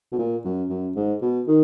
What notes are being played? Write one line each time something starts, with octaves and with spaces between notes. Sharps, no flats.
B2
A#2
F#2
F#2
G#2
B2
D#3